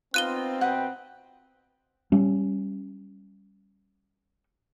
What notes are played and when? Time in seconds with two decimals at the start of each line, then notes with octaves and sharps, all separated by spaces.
0.14 B3 C4 D#4 F4 F#6 D#7 G7
0.61 B2 B4 F#5 G5 D#6
2.12 G3 C#4